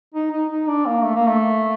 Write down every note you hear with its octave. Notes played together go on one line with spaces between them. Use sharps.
D#4
D#4
D#4
D4
A#3
A3
A#3
A3